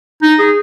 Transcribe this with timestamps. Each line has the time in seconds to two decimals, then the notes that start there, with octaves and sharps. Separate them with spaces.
0.22 D#4
0.39 G#4